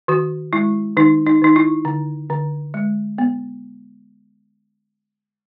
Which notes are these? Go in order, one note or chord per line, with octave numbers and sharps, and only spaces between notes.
D#3 F#4
G#3 E4
D#3 D#4
D#4
D#3 D#4
E4
D3
D3
G#3
B3